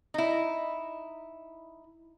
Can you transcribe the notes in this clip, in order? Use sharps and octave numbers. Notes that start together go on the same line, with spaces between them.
D#4 E4